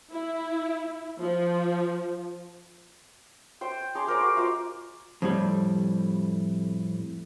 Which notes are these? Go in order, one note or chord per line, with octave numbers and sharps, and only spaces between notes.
E4
F3
C5 G5
G#4 A#5 C6 D6
G#4 A#4 C5 D5
F#4
F4 C5 D#5
F2 A2 G3